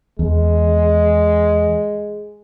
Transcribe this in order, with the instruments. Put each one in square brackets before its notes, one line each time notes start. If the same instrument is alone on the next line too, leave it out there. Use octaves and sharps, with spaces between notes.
[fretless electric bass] E2 [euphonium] G#3